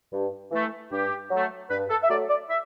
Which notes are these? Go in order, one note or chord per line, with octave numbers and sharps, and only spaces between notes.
G2
E3 A3
G2 G4
F#3 A3
G2 B4
A4
E5
F#3 A3 D5
D5
E5